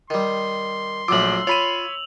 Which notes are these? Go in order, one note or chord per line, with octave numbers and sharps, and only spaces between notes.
D#3 G3 C6
A#1 F3 F#3 A3 D6 E6 F#7
F4 C#5 B5 D#7 F7